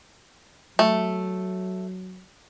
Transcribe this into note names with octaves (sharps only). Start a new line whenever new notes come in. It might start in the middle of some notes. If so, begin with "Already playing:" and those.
F#3 A3